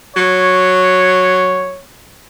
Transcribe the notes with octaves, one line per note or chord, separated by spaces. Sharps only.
F#3 C#5